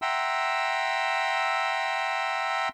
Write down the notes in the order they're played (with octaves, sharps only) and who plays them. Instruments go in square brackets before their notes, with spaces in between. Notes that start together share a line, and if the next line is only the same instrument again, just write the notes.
[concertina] E5 F#5 G5 A#5 C6 E6